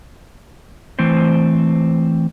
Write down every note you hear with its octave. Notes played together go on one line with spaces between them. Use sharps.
E3 A3 C4 C5